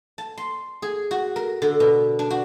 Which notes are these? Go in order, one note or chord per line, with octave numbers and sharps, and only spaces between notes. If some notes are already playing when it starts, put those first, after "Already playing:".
A5
C6
G#4
F#4
A#4
D3
B2
D4
F#4